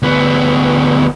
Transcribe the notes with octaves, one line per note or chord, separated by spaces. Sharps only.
D2 B3